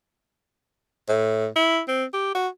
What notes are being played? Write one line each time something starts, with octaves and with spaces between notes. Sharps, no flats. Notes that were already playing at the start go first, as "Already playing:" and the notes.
A2
E4
C4
G4
F#4